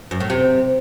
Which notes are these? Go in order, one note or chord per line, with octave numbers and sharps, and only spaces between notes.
F#2
A2
C3